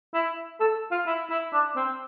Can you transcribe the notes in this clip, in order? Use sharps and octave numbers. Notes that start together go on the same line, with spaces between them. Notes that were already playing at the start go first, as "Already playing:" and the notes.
E4
A4
F4
E4
E4
D4
C4